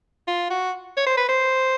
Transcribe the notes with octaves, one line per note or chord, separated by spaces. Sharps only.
F4
F#4
C#5
C5
B4
C5